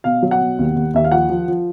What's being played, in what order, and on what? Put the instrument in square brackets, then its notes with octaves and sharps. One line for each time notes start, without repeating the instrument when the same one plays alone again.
[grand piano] B2 F5
F#3
F#5
B2
D#2
D#2
D#2 E5
F5
F3 F#5
F3
F3